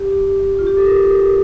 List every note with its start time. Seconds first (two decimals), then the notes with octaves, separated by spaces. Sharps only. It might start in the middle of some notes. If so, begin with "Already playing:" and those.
Already playing: G4
0.59 F4
0.67 G4
0.77 A4
0.86 A#4